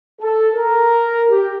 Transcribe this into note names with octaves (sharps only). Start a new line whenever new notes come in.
A4
A#4
G4